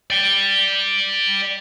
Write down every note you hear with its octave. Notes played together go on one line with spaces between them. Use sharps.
D5 G5